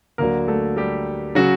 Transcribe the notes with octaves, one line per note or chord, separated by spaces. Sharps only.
D2 D3 F#3 A#3 A#4
A3 A4
G3 G4
C#3 F#3 F#4